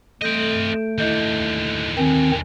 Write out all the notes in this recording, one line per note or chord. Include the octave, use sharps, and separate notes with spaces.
A3 C4 A4 D#5 G6 D7
D#2 D3 E4 D#5 G6
D#3 C4 A#4 G#5